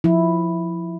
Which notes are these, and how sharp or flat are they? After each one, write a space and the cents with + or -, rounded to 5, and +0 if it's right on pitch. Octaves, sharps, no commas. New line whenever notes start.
F3 +0 E4 +0